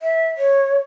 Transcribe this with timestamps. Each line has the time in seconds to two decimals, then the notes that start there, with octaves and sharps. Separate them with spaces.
0.02 E5
0.38 C#5